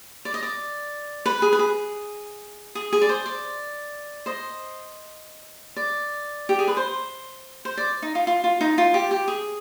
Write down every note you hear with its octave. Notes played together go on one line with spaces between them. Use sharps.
D5
D#5
D5
B4
G#4
B4
G#4
G#4
G#4
D5
C5
D5
C5 D#5
D5
G4
G#4
B4
C5
C5
D5
D#4
F4
F4
F4
D#4
F4
G4
G4
G#4